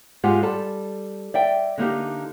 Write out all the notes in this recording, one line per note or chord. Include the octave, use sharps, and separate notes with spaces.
G#2 G#3 F4 G4 F#5 G#5
G3 A4 A5
D5 E5 G5
D3 A#3 D#4 G4